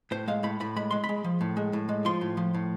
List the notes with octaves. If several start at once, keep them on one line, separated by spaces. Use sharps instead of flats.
A2 C5
G#3 F5
A2 B5
A2 B5
G#3 B5
G#3 C6
B5
G#3
F3
A2
G#3
A2
G#3
F3 C6
A2
F3
A2